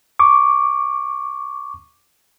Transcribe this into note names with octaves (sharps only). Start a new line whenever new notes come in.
C#6 D6